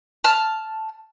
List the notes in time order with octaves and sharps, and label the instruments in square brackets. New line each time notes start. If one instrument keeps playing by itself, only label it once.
[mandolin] A5 F6